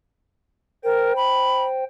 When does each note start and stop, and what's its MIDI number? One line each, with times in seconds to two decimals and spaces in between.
0.84 1.13 70
0.84 1.84 72
0.84 1.84 79
1.16 1.63 83